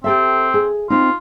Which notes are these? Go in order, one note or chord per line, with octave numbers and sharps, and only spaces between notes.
C4 G4 A4 E5
G#4
C4 D#4 F4